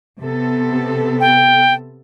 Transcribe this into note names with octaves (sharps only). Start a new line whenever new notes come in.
C3 B3 A4
G5